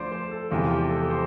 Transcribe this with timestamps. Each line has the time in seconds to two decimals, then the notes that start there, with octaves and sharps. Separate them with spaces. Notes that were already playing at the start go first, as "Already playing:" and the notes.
Already playing: D2 D3 F3 A3 C5 D5
0.12 C5
0.31 A4
0.51 E1 E2 C3 F3 F4
0.65 F4
0.70 G4
0.90 A4
1.10 C5